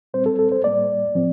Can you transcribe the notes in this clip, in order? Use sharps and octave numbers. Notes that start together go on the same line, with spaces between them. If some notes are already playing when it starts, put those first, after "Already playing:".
A#2 G3 C4 C5
A4
A4
C5
A2 G3 A#3 D5
A2 F3 C4